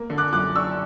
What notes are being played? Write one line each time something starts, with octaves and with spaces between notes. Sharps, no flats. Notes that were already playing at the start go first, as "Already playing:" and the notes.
Already playing: A#3
D3
D6 F#6
F#2 D6 F#6
D4 C#6 E6